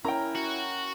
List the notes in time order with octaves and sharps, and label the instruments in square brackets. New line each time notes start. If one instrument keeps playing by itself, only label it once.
[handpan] C#4 A#4 [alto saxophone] E4 [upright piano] G5 A#5
[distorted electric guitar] F#4